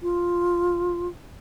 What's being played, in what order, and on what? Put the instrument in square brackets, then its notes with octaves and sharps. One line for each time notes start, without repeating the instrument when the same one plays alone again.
[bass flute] F4